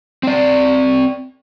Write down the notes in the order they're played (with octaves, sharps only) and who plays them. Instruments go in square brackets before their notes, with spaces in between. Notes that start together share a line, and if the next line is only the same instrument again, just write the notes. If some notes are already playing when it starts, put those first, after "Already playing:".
[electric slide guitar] C4 D5